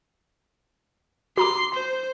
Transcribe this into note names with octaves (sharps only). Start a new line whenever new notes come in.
F#4 A#5 C6 D6
C5